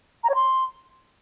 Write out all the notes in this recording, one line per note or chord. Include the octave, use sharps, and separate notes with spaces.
A#5
C#5
C6